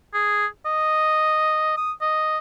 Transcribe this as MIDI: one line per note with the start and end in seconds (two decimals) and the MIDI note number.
0.14 0.46 68
0.66 1.74 75
1.77 1.92 87
2.01 2.38 75